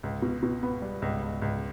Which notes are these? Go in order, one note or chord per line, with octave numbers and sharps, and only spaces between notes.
C#2
B2
B2
B3
G3
C#2
C#2
C#2